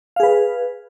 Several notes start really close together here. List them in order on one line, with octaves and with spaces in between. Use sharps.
F5 G#4 B4